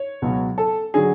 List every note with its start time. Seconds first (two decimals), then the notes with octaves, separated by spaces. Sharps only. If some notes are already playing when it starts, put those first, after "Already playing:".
Already playing: C#5
0.22 C#2 B2 F#3
0.58 A4
0.94 D3 F#3 G#4